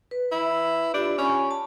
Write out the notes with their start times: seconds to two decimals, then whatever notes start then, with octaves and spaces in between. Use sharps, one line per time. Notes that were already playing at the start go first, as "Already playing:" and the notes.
0.11 B4
0.31 E4
0.94 D4 F4 G4
1.18 C#4 G#5 B5 C#6
1.51 A5